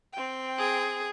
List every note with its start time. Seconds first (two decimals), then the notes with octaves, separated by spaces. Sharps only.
0.13 C4 G5
0.59 G#4